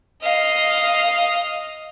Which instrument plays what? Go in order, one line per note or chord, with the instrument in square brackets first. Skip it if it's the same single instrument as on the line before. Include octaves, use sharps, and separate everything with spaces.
[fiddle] D#5 F5